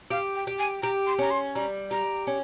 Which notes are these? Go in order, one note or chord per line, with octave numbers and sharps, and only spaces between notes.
G4 F5
G5
G4
G#5
G4 A#5
C6
C#4 A#5
C6
G3 A#5
G4 A#5
C#4